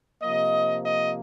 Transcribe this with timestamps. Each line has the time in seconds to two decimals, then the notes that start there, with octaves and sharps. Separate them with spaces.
0.22 C3 F3 A#3 D#5
0.84 D#5